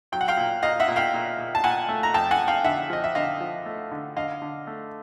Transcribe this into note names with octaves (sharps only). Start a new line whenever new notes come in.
F#3 G5
F#5
F5 G5
A#2
A#2 D#5 F5
E5 F#5
A#2
F5 G5
A#2
A#2
A5
A#2 F#5 G#5
A3
A#5
F2 G5 A5
F#5 G#5
F2
F5 G5
D3 E5 F#5
F3 D#5
E5
D3 D#5 F5
F3
A3
D3
D3 D#5 F5
D3
A3